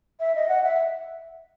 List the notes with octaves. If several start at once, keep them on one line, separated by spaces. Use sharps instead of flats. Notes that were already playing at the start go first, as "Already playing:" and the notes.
E5
D#5
F#5
E5